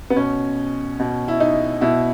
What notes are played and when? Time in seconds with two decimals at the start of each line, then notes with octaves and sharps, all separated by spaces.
0.10 B3
0.16 B2 C#4
0.99 B2
1.28 E4
1.40 D#4
1.81 B2 E4